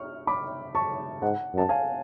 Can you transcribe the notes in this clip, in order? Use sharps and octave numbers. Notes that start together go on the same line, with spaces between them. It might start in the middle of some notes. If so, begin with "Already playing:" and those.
Already playing: C#6 F6
B5 D6
A5 C#6
G#2 F#5
F#2 A5
F5 G#5